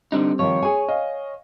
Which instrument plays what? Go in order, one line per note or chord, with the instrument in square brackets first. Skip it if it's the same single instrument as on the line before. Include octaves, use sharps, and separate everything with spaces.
[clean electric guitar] D3 D4 D#4 [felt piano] G3 C4
[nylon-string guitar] D#3 F3 [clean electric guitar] C#5
[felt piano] G#4 C#6 [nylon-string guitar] G#5
[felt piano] D#5 F5